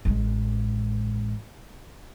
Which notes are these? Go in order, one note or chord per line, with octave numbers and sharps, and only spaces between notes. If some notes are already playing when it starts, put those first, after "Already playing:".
A1 G#3